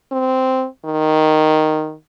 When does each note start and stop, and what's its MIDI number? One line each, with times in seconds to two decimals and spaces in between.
0.12 0.66 60
0.85 1.94 51